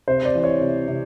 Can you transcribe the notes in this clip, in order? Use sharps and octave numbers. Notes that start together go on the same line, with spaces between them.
C3 C5
D5
E3
C#5
C3
C3